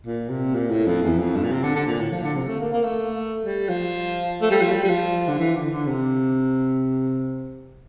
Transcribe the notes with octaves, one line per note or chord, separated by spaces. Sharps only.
A#2
C3
A#2
A2
F2
E2
F2
G2
A#2
C3
D3
D3
A#2
A2
F3
D3
C3
A3
A#3
A#3
A3
G3
F3
A3
G3
F3
G3
G3
F3
D3
E3
D3
D3
C3